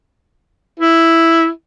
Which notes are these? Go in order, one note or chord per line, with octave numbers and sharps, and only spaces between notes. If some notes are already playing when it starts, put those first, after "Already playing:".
E4